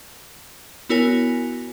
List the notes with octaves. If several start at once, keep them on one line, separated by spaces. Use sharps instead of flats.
B3 E4 F#4 A#4 C#5 G#5